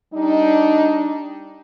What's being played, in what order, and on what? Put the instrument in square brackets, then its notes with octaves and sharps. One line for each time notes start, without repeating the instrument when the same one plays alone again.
[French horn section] G3 D4 D#4